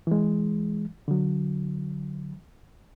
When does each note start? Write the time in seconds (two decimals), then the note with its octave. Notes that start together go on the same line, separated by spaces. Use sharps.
0.07 E3 G#3
1.08 D3 F#3